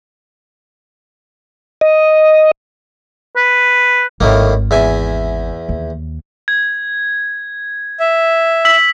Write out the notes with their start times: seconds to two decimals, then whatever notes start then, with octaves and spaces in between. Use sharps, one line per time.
1.81 D#5
3.36 B4
4.21 G#1 A2 D#3 A#3
4.71 E2 E5 G#5
5.69 D#2
6.48 G#6
8.00 E5
8.65 E6 B6 F#7